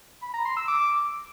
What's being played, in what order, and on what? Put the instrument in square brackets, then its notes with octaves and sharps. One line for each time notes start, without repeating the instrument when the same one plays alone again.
[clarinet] B5
A#5
C6
E6
D6